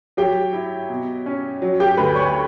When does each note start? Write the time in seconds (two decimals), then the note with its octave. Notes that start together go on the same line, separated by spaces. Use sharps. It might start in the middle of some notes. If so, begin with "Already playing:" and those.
0.17 F#3 G4 G5
0.53 E4
0.89 B2
1.26 C#4
1.62 F#3
1.80 G4 G5
1.97 D2 B4 B5
2.15 C#5 C#6